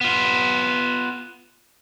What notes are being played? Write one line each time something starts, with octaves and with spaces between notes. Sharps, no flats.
B3 F4